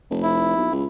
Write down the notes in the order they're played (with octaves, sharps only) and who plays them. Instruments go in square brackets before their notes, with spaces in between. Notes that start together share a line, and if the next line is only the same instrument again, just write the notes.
[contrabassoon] F1
[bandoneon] E4
[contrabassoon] B1
C#2